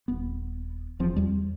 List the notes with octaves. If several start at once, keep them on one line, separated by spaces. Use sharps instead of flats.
D#1 B3
E1 E2 F3 C4
E2 G3